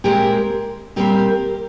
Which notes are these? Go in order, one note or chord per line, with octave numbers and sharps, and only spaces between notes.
A#2 G#3 C4 G4 A#4
A#2 G3 C4 G4 A#4